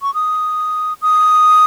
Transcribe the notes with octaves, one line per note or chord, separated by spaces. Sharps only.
C#6
D#6
D#6